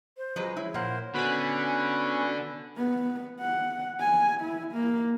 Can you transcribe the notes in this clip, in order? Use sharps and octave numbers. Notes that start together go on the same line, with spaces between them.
C5
F3 F#3 G#3 G#4 B4
E4 C#5
A#2 A#3 A#4 C5 F#5
D3 B3 C#4 F#4 G#5 B5
B3
F#5
G#5
E4
A#3